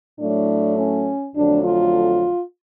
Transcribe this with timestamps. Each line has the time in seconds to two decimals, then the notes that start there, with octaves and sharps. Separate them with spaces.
0.19 A2 F#3 A3 D4
0.77 C#4
1.35 F2 D3 F#3 A3 D4
1.64 F4